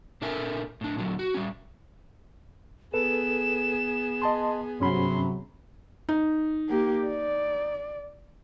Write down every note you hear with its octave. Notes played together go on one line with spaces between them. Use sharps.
A#2 D4 A4 A#4 E5 G#5
A2 D4
A#2 D3 F#3
F#4
G3 C#4
B3 G#4 A4 B4 E7
D#5 A5 C6
G2 C3 F#3 C#4 B5 C6
D#4
A#3 G4
D5